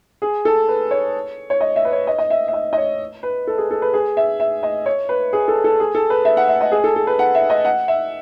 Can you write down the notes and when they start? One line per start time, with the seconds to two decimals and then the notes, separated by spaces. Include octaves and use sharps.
0.22 G#4
0.45 A4
0.68 B4
0.91 C#5
1.50 C#5
1.61 D#5
1.76 E5
1.85 B4
1.92 C#5
2.07 D#5
2.18 D#5
2.30 E5
2.48 E5
2.53 D#5
2.73 D#5
2.78 C#5
3.23 B4
3.47 A4
3.58 G#4
3.71 A4
3.82 B4
3.93 G#4
4.17 E5
4.40 E5
4.63 D#5
4.86 C#5
5.09 B4
5.33 G#4
5.48 A4
5.64 A4
5.80 G#4
5.95 A4
6.10 B4
6.25 E5
6.37 F#5
6.48 E5
6.61 D#5
6.72 G#4
6.84 A4
6.96 A4
7.07 B4
7.19 F#5
7.35 E5
7.50 D#5
7.65 F#5
7.88 E5